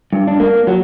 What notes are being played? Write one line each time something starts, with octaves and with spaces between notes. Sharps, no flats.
G2
D4
A#3
F#3